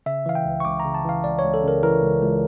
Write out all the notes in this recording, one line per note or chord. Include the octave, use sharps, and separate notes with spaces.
C#3 E5
E3 F5
G5
C#2
C#6
C#2 D6
A#5
C#3
A5
E3 F5
C#2 D5
C#2 C#5
A4
C#3 A#4
E3 A#4
C#2
C#2